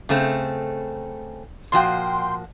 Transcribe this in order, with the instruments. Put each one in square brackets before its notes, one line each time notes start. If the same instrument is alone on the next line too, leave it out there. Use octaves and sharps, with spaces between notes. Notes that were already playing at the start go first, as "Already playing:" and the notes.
[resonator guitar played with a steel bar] C#3 A3 C4
[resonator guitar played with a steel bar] A#2 F3 F#4 [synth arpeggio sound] G5 C6